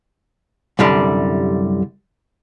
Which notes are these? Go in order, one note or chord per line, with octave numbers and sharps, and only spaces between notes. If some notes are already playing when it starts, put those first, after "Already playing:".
C2 F#2 D3 G3 D5